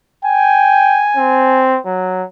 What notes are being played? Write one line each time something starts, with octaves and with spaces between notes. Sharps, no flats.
G5 G#5
C4
F#3